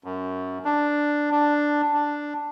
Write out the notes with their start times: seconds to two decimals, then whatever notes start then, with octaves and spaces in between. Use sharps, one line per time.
0.04 F#2
0.65 D4
1.31 D4
1.94 D4